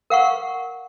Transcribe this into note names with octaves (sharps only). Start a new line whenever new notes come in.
A#4 F5 F#5 C#6